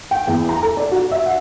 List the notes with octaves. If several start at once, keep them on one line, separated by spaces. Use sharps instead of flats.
G5
E2
A#5
A4
D5
F#4
E5
F#5